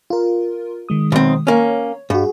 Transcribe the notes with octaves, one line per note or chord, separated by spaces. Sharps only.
F4 A#4
D#3 G#3 D#6
B1 C4
A#3 C#4 C#5
G2 F#4 G#4